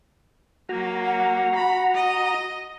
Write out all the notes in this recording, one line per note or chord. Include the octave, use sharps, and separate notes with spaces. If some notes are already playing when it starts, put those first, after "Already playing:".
F#3 A#3 F#4 A#5
F#5
B5
D#5